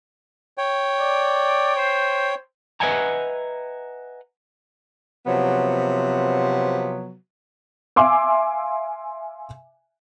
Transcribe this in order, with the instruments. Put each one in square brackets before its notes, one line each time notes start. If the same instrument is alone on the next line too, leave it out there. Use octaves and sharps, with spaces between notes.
[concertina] C#5 G5
[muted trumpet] D5
C5
[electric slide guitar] B4 D#5 E5 F#5 G#5 A#5
[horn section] C3 F3 F#3 B3
[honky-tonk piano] E5 F5 G#5 C6 D6 E6